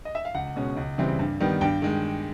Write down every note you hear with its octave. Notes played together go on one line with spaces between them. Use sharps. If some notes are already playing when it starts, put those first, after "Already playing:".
D#5
E5
F5
C#2 F#5
B2 G#3 C#4
C#2
C#3 E3 G3 C4
G2
D#3 G3 B3
G2 G5
D#3 G#3